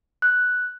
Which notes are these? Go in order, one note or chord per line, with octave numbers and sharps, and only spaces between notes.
F#6